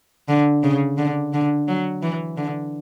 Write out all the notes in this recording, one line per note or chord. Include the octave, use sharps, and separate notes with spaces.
D3
C#3
D3
D3
F#3
E3
D3